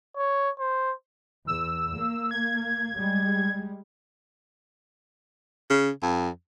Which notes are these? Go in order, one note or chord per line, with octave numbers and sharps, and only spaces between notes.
C#5
C5
E2 E6
A#3
G#6
G3 G#3
C#3
F2